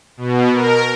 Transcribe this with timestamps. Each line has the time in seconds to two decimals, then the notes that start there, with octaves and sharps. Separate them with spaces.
0.17 B2
0.53 A#4